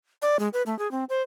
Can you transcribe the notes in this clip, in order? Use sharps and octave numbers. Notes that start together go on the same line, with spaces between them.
D5
G#3
B4
A3
G#4
C4
C5